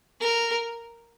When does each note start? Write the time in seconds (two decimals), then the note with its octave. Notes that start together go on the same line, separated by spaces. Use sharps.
0.21 A#4